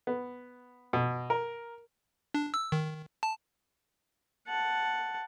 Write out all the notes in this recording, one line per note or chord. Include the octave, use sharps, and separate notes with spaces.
B3
B2
A#4
D4
E6
D#3
A5
F#5 A5